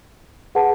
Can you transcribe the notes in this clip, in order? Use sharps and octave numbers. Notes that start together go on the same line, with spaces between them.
G#4 B4 F#5 A5